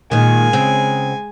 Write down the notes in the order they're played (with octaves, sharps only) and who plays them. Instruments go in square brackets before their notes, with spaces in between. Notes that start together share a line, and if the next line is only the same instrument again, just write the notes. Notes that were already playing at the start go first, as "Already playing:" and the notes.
[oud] A#2 D#3 [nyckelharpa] G#3 G#5
[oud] C#3 C4